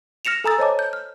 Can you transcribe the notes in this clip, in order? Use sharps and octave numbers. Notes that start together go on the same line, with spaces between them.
F6 A#6 C#7 E7 F7
A4 G#5 A#5 D#6 E6 A6
C5 C#5 D#5 A5 D6
G6
F6